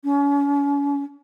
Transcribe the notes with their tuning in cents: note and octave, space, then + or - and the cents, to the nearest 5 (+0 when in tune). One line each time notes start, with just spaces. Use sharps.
C#4 +40